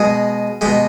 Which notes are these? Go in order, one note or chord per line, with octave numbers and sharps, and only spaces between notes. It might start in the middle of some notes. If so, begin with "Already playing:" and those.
Already playing: B2 G#3 G#4
B2 G#3 G4